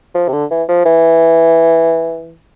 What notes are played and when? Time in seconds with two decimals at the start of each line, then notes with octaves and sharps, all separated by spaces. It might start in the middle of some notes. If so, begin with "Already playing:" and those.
0.15 F3
0.28 C3
0.33 D3
0.51 E3
0.69 F3
0.85 E3